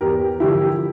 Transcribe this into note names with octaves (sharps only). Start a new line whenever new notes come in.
E2 G4 A#4
D3 F3 E4 G4